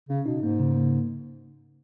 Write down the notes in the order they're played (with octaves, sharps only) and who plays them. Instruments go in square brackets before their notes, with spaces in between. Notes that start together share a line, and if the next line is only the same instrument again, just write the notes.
[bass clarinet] C#3 [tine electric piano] C#4
[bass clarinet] B2 [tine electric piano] D#4
[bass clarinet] G#2 [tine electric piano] A#3
[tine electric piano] C#3
A#3